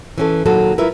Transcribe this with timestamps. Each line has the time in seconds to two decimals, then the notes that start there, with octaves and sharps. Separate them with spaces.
0.18 E3 C#4 A4
0.45 D#2 A#2 F#3 A4
0.78 E4 F4 A#4 B4 E5